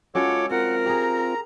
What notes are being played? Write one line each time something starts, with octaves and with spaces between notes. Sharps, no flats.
G#3 C#4 F4 F#4 A4 C#5 D6
C4 F4 A#4 F#5
G4 G#4 A#5